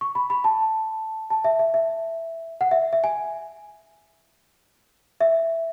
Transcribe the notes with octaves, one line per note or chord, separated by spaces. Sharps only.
C#6
B5
B5
A5
A5
E5
E5
E5
F#5
E5
E5
G#5
E5